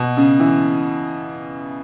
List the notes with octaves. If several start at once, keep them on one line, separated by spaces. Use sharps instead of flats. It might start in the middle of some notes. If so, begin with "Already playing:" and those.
Already playing: B2
C#3
E3